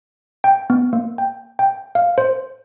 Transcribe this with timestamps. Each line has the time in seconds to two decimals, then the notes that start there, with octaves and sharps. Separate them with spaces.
0.44 G5
0.70 B3
0.93 A#3
1.18 G5
1.59 G5
1.95 F5
2.18 C5